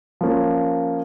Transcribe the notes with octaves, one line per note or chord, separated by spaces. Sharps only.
F3 A#3 C#4